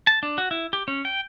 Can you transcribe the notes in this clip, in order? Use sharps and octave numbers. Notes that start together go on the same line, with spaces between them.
A5
D4
F#4
E4
G4
C#4
G5